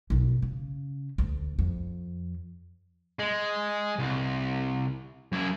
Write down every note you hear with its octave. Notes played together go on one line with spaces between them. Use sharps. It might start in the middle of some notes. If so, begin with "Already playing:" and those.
B1 F#2
C#3
D2
F2
G#3
C2
F#2 E4